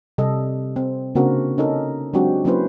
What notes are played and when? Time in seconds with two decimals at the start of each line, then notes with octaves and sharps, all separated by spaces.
0.18 C3 G3 A4 D#5
0.76 C4
1.15 C#3 A#3 C4 D4 F#4 A#4
1.58 C#4 D#4 A4 A#4
2.13 F#3 G#3 C4 D4 F#4 G4
2.45 F#3 A#3 C#4 E4 B4 C5